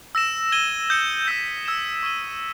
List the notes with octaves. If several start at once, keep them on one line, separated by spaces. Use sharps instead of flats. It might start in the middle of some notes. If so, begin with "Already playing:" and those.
E6 A#6 E7
G#6 D#7 G7
D#6 G6 C#7
E6 G6 B6
E6 G#6 C#7 E7
C#6 G#6 D#7 G7